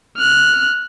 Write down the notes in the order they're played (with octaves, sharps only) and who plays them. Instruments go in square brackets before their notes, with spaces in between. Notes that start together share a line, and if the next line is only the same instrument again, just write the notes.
[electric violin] F6 F#6